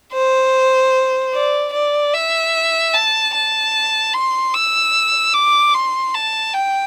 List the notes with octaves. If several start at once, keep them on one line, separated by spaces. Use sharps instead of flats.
C5
D5
D5
E5
A5
A5
C6
E6
D6
C6
A5
G5